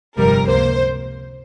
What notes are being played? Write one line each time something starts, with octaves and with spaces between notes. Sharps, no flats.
G1 F2 C3 G3 A#4
C#2 C3 A#3 C5